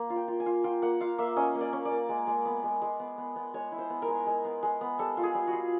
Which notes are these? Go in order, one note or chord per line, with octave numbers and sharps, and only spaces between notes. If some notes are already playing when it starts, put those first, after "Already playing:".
Already playing: A#3
F4
G5
F4
G#5
F4
F4 G5
A#3 F#5
F4 F5
A#3 E5
C#4 D#5
A#3
D5
C#4
D5
A#3
G#3
G#3
B3
G#3
G#3
B3
B3
B3
G#3 C#5
E4
C5
B3
A#4
G#3
G#3
B3
G#3
B3
G3 A4
F4
G#4
G3
F#4
F4